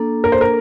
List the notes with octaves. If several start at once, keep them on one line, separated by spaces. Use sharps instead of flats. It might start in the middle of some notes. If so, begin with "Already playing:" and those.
Already playing: A#3 D4 A4
A#4
C5
A#4